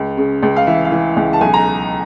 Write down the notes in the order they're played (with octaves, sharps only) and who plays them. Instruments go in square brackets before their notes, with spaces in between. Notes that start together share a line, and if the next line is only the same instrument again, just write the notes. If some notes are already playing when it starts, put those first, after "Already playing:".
Already playing: [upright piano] C#2
C#3
C#2
F5
E3 E5
F5
E3
C#2
A5
B1 G#5
A#5